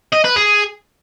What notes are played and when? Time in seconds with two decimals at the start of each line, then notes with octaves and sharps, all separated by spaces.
0.13 D#5
0.25 B4
0.36 G#4